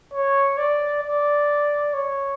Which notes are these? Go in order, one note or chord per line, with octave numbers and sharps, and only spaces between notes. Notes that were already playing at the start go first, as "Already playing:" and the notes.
C#5
D5
D5
C#5